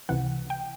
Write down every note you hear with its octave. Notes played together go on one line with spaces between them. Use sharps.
C#2 C3 E3 F#5
G5